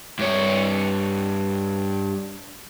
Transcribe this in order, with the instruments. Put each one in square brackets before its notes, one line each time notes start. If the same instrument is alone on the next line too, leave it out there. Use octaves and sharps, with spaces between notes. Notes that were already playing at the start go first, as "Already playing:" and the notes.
[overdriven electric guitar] G2 C#5